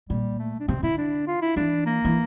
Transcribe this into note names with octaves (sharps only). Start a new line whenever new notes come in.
A#2 G3
A3
D4
C3 C4
D3 E4
D4
F4
E4
E3 D4
A#3
E3